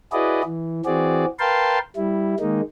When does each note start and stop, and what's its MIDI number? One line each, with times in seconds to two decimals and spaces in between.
0.13 0.42 64
0.13 0.42 66
0.13 0.42 68
0.13 0.42 71
0.13 0.42 74
0.13 0.42 75
0.45 0.81 52
0.86 1.25 52
0.86 1.25 60
0.86 1.25 66
0.86 1.25 68
0.86 1.25 74
1.39 1.79 70
1.39 1.79 71
1.39 1.79 77
1.39 1.79 79
1.39 1.79 81
1.39 1.79 84
1.96 2.35 55
1.96 2.35 64
2.40 2.61 51
2.40 2.61 56
2.40 2.61 58
2.40 2.61 63